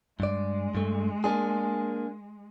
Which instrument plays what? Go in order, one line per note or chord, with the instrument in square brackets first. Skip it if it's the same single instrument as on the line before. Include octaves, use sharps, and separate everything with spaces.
[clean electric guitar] G2 D5 [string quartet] G#3
[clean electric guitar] G2 A3
A#3 D4 G#4